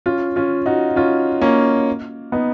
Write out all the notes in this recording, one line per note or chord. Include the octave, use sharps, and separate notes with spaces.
C#4 F4
C#4 F4
D#4 F#4
C#4 F4
A#3 C#4
B3 D#4